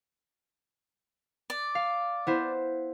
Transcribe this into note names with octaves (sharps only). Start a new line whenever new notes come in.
D5
F5
B3 E4 C5